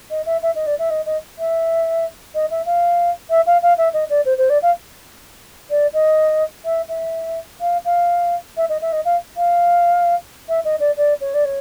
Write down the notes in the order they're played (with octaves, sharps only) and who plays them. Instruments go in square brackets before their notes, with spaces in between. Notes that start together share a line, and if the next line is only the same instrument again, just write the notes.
[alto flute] D#5
E5
E5
D#5
D5
E5
D#5
D#5
E5
D#5
E5
F5
E5
F5
F5
E5
D#5
D5
C5
C5
D5
F5
D5
D#5
E5
E5
F5
F5
E5
D#5
E5
D#5
F5
F5
E5
D#5
D5
D5
C#5
D5
C#5